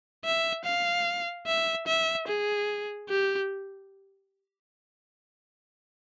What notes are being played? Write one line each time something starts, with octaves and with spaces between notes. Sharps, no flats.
E5
F5
E5
E5
G#4
G4